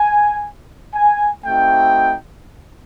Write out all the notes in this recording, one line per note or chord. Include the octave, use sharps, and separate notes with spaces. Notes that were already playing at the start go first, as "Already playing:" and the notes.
Already playing: G#5
G#5
A3 C4 D#4 F#4 G5